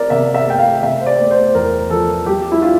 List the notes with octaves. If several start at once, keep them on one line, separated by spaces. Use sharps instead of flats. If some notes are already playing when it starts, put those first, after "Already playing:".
Already playing: C4 A#4 D5
C3 E5
E5
A3 G5
F5
C3 E5
C5
D5
A3
C5
E2 A#4
F3 A4
G3 G4
E4
D4 F4